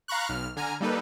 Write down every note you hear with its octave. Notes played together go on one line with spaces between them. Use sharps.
F5 A#5 B5 C#6 F#6
B1 F6
D3 G#5 A#5 F6
G3 A#3 D#4 A4 B4